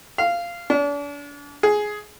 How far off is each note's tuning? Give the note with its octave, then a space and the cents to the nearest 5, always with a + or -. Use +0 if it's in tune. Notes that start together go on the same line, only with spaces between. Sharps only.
F5 -15
D4 -40
G#4 +10